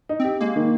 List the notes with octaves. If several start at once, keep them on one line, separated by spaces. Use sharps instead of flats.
D#4
C4 G4
G#3 A#3
D#3